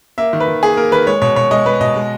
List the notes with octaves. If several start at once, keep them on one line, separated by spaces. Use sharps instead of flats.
A#3 E5
D#3
B4
D#3
A#3 G#4
A#3 A#4
D#3 B4
G#3 C#5
B2 C#5
B2 C#5
G#3 D#5
G#3 B4
B2 D#5
G#3